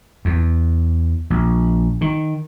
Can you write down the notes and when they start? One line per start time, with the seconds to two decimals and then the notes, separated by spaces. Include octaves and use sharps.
0.25 E2
1.30 A#1
2.01 D#3